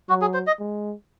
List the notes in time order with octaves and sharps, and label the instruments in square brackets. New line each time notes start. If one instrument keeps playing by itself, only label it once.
[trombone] F#3 [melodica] F#4
[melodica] G#4
C5
D#5
[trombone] G#3